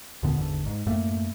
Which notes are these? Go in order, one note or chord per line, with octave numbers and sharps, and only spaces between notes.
D#2 A#2 D3 B3
G#1 E2 D3
G#2
F#2 A2 A3 A#3